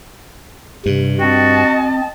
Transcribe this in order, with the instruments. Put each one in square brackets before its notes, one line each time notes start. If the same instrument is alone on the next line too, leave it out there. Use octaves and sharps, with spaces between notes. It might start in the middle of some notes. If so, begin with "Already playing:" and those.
[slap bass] G2 [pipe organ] C3
[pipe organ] C4 [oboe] F#4 [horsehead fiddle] D#5 A5